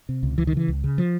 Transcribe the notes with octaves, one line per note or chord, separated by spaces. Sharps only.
C3
C#2
C#2 E3
D#3
C#3 E3
C#2
C#3
F3